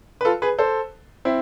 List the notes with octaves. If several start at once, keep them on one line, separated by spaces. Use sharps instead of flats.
B4
F4 A4
G#4 B4
A4 C5
C4 E4